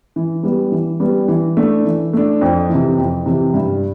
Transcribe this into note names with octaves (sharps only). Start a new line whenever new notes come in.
E3
G3 B3
E3
G3 B3
E3
A3 D4
E3
A3 D4
F2
C3 E3
F2
C3 E3
G2